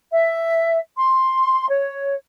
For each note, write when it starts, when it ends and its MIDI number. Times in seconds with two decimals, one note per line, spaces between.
0.12 0.80 76
0.96 1.68 84
1.69 2.14 73